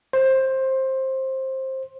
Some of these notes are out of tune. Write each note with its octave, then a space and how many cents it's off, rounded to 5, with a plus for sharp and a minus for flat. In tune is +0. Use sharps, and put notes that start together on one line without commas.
C5 +15